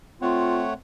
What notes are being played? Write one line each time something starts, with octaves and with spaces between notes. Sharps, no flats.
A3 C4 F4 C#5 F#5